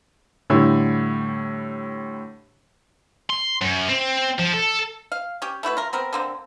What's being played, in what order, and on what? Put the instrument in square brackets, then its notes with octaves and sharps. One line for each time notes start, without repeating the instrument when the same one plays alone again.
[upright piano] A2 D3 G3 E4
[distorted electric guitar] C6
F#2
C4
F3
A4
[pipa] F5
C#4 G4
A3 E4 F#4 B4
F4 A#4
B3 C4 A#4
D3 A#3 C4